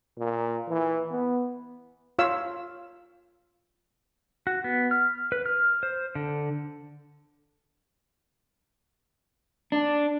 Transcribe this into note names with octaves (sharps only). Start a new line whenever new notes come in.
A#2
E3
B3
F4 C#5 F5 E6
F#4
B3
F6
B4
F6
C5
D3
D4